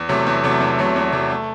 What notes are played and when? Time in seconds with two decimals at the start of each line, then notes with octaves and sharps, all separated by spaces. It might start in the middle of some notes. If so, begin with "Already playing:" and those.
Already playing: E2
0.09 C3 F#3 A3
0.27 E2
0.44 C3 F#3 A3
0.60 E2
0.79 C3 F#3 A3
0.96 E2
1.12 C3 F#3 A3
1.30 A3